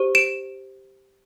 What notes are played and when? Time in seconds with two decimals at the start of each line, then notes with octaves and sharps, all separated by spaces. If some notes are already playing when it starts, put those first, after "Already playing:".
Already playing: G4 C5
0.15 D7 E7